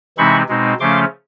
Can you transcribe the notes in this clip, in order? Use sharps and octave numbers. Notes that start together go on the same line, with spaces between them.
C3 E3 G#3 C4 D#4 B5 C#6
B2 G#3 C4 D#4
C#3 F3 A3 C#4 C6 D6